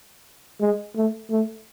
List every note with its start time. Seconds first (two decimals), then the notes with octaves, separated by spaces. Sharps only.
0.60 G#3
0.95 A3
1.30 A3